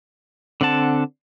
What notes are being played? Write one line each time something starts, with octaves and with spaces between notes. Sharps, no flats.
D3 C4 F#5 A5